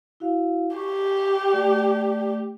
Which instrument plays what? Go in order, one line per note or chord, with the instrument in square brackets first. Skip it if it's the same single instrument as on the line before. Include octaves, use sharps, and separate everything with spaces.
[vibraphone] E4 F#4 F5
[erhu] G4 [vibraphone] C#6
[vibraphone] A3 D5